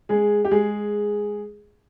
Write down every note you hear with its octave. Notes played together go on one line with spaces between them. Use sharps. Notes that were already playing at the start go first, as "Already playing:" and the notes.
G#3 G#4
G4
G#3 G#4